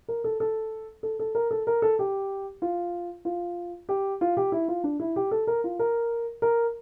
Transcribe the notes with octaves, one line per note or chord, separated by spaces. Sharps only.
A#4
A4
A4
A4
A4
A#4
A4
A#4
A4
G4
F4
F4
G4
F4
G4
E4
F4
D4
E4
G4
A4
A#4
F4
A#4
A#4